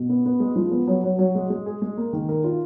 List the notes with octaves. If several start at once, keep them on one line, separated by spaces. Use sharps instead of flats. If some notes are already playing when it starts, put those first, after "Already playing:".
Already playing: B2
B3
B3
G#3
F3
B3
F#3
F#3
F#3
G#3
G#3
G#4
G#3
A#3
D#3
A#4
F4